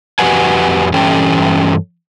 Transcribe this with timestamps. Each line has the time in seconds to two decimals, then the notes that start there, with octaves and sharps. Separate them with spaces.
0.19 F2 F#4 G4 B4 F#5 G#5
0.93 G2 E3 C#4 G4 A4 G5